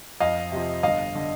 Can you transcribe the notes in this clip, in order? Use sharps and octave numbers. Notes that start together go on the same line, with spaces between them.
F2 D#5 F5
C3 F3
G1 D#5 F5
D3